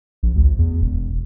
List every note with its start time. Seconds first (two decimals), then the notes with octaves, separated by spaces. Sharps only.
0.23 A#1
0.36 D2
0.58 E2
0.82 E1